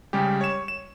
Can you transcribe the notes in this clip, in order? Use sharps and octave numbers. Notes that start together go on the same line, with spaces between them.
C#3 G3 G#3 G4
C#5 E7
E7